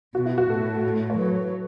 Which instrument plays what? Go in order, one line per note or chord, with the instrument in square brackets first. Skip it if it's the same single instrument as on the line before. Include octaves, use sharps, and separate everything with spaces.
[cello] B2 [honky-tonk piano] F#4
[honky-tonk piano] E4
F#4
[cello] A2 [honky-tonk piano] A4
[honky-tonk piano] C#5
[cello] F#3 [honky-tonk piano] B4